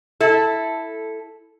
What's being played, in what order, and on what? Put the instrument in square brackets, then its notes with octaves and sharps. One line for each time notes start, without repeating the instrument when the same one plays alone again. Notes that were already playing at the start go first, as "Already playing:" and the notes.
[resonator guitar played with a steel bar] E4 A4